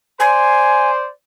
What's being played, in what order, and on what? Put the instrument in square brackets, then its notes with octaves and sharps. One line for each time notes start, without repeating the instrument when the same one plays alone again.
[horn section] C5 D5 C6 [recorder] G#5